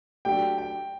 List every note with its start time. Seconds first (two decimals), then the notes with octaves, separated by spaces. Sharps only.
0.25 F#3 A3 D4 G4 G5
0.58 G5